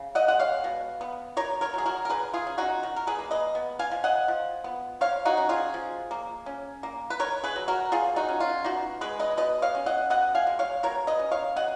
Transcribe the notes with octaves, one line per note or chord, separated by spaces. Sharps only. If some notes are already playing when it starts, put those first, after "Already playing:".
Already playing: C#3
D#5 F#5
G#3 F#5
C#5 F5
B2
B3
B2 A#4 C#5
A#4 C#5
F#3 G#4
F#4 A#4
A#4
D#3 G#4 B4
F4 G#4
C#4
D#4 F#4
D#3
A#4
G#4 B4
A#3
B4 D#5
B3
F5 G#5
F3
D#5 F#5
F3
B3
F3 C#5 F5
D#4 F#4
C#4
F4 G#4
F3
A#3
C#4
A#3
B4
D#3 A#4 C#5
G#4 B4
F#3
F#4 A#4
B2 F4 G#4
D#4 F#4
C#4
F4
B2 D#4 F#4
G#3 G#4 B4
B4 D#5
B2 B4 D#5
C#5 F5
C#4
D#5 F#5
B2 D#5 F#5
F5 G#5
G#3
C#5 F5
B2 A#4 C#5
B4 D#5
C#4
C#5 F5
B2 D#5 F#5